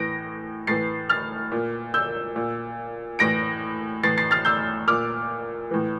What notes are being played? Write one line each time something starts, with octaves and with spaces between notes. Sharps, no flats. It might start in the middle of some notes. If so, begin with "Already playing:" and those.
Already playing: A2 E3 A#6 D7
A2 E3 A6 C7
F6 A6
A#2
E6 G6
A#2
A2 E3 A#6 D7
A2 E3 A6 C7
A6 C7
F6 A6
E6 G6
A#2 D6 F6
A2 E3